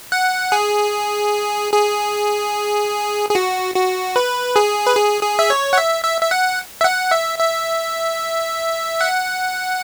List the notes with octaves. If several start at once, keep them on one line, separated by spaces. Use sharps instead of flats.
F#5
G#4
G#4
G#4
F#4
F#4
B4
G#4
B4
G#4
G#4
E5
C#5
F#5
E5
E5
E5
F#5
E5
F#5
E5
E5
F#5